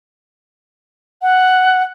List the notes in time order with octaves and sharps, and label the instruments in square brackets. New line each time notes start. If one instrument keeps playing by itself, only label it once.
[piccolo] F#5